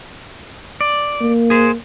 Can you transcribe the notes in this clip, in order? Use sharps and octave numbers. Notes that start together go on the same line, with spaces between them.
D5
A#3
G#4 C5